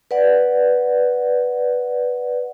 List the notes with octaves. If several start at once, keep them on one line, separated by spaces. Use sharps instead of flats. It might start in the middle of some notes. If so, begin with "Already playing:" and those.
B4 D5 F#5